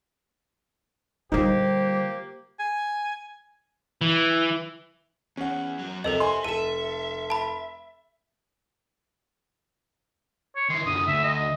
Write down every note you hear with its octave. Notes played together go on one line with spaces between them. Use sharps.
A#2 D3 G3 A#3 D#4 F4 G4 C5
G#5
E3
E2 C#4 F#5
F#2 F#3
F2 C3 A4 A#4 C5 D#5 E5
G#5 C6
F1 A4 E5 D#7 E7
A5 B5
C#5
D#3 E4 C6
F#2 D3 D#6
D2 E5
D#5